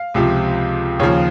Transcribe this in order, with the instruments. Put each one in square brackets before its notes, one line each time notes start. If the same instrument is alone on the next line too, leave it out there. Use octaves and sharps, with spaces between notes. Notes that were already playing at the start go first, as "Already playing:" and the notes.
Already playing: [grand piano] F5
C#2 C3 F3
D#2 C#3 F3 C#5